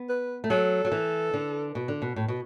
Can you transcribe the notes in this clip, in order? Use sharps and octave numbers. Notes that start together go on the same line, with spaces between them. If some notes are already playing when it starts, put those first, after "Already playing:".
Already playing: B3
B4
A3
F#3 A4
F#3
E3
D3
B2
D3
B2
A2
B2